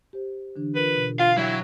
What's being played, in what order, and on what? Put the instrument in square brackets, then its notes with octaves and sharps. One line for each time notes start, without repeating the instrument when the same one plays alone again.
[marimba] G4 C5
D3 E3 D4
[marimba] F4 A#4 [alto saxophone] B4
[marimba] B2
[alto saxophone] F4 [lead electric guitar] F5
[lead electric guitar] F#3 [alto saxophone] E4 [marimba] F5 G5